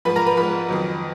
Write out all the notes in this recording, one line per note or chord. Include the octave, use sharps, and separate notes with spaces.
G#2 F3 B4 B5
A#4 A#5
B4 B5
G#2 F3 B4 B5
F2 D#3 F#3